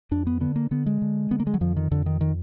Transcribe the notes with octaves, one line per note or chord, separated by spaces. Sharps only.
F2 D4
B3
D3 B3
A#3
D3 B3
G#3
D3
D3 B3
A#3
G#3
F#3
F2 F3
D#3
F2 D3
D#3
D#3